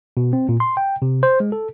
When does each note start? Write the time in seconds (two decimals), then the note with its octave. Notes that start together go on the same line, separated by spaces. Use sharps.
0.17 B2
0.33 C4
0.49 A#2
0.60 C6
0.77 G5
1.02 C3
1.23 C5
1.40 G#3
1.52 A4